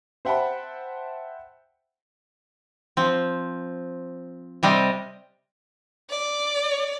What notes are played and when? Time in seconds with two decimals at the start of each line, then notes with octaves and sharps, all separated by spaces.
0.25 C5 E5 F#5 G5 A5 B5
2.97 F3 C4
4.63 C3 G3 C4 D#5
6.10 D5